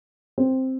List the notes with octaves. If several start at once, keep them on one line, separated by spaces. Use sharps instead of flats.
C4